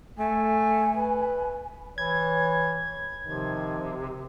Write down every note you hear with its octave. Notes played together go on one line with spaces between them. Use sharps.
A3 G#5
B4
E3 C#5 G#6
C3 D#3 F3